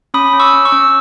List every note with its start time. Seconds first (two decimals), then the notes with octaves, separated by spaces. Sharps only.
0.14 C#4 B5 D#6
0.33 C#4
0.40 C#6 E6
0.53 C#4
0.65 C#6 E6
0.72 C#4